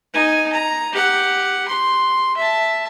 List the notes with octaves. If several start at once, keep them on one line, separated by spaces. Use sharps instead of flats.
D#4 G#5
A#5
G4 F#5
C6
E5 A5